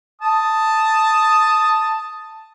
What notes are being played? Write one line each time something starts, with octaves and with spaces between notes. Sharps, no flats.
A5 D#6